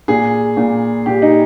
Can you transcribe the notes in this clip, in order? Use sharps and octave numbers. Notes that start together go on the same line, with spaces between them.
A#2 G#4
A#2
A#2 G4
D#4